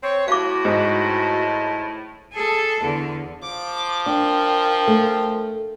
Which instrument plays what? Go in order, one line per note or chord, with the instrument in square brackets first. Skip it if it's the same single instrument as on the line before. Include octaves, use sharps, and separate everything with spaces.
[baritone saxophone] C4 [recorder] C#5
[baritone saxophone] A2 [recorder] F#4 [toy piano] F5 D6
[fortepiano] G#2
[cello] G#4 A4
E2 D3
[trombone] F3 [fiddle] D6
[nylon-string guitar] D4 [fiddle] A#4 G5
[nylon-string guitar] A3